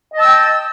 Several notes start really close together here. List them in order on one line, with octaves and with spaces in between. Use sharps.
D#5 A5 E6 G5